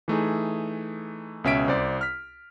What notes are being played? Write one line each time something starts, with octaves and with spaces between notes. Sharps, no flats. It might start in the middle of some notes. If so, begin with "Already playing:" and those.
E3 A3 D#4 G#4
C#2 B2 C#4 E5 B6 D7
C2 C5 D5
F6 B6